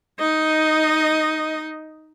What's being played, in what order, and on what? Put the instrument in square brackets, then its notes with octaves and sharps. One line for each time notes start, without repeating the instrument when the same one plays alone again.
[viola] D#4 D#5